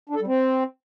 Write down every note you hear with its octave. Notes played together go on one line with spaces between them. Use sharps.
D4
A4
G3
C4